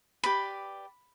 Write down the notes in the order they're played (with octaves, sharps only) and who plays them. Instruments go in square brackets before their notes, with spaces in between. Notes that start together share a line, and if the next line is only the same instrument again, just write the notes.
[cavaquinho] G4 B4 D5 B5